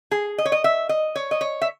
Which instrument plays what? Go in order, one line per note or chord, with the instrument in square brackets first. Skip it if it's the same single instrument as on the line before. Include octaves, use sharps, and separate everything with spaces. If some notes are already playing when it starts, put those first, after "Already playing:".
[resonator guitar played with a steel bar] G#4
D#5
C#5
D#5
E5
D#5
C#5
D#5
C#5
E5